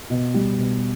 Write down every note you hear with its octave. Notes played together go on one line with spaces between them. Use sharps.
B2
G3
B2